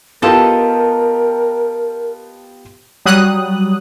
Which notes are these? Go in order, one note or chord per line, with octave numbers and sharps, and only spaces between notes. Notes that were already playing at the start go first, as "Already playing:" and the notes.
B3 F4 G4 A4 A#4 D#5 A5
F#3 G3 D#6 F#6